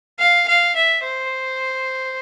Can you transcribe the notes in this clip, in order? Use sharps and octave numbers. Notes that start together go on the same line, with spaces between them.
F5
F5
E5
C5